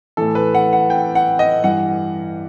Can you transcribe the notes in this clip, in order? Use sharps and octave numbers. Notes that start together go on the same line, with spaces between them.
A2 E3 A4
B4
F#5
F#5
G5
F#5
D#5
G2 E3 F#5